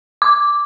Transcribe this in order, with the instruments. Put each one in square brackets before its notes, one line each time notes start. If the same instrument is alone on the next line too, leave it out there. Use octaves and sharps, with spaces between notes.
[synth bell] D6